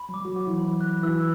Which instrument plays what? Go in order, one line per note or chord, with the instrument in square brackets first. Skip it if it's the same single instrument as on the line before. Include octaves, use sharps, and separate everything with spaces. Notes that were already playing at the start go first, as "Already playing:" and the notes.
Already playing: [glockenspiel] B5
[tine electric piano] F#3
[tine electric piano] G3 [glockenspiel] D6
[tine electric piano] F#3 F#4
[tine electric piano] F#3 F#4 [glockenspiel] D6
[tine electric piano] E3 E4
[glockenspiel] B5
F#6
[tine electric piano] E3 E4 [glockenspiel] E6